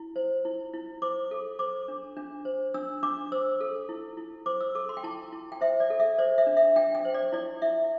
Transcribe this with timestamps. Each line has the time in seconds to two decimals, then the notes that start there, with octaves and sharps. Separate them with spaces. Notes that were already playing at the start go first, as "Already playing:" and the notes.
Already playing: E4
0.16 C5
0.45 E4
0.74 E4
1.02 C5 D6
1.31 A4
1.59 C5 D6
1.88 D4
2.17 D4
2.45 C5
2.74 D4 E6
3.03 D4 D6
3.32 C5 E6
3.61 A4
3.89 E4
4.17 E4
4.46 C5 D6
4.61 E6
4.75 A4 D6
4.89 C6
4.97 G5
5.04 E4 A5
5.32 E4
5.52 G5
5.61 C5 E5
5.80 D5
5.90 A4
6.00 E5
6.18 C5 D5
6.38 E5
6.47 D4
6.57 E5
6.76 D4 G5
6.95 G5
7.05 C5
7.14 D5
7.32 E4 D5
7.62 E4 E5